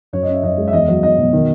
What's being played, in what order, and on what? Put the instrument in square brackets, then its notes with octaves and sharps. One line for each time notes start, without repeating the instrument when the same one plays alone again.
[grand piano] F#2 C#5
D#5
C#4 E5
F#2 D#5
G#3
E5
E2 D#5
F#3
E2 D#5
B2
D#3